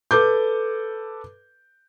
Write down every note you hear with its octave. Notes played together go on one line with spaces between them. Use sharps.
A4 B4 D6 G6